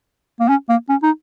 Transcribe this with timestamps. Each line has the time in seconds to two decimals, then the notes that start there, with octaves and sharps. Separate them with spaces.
0.40 A#3
0.49 C#4
0.69 A#3
0.89 C#4
1.03 D#4